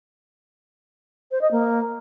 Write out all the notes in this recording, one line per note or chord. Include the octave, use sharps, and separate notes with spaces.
C5
D#5
A#3